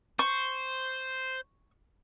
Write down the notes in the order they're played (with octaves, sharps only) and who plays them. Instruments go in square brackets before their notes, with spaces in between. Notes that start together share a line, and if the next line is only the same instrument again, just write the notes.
[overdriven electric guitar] C5 [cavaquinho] C#6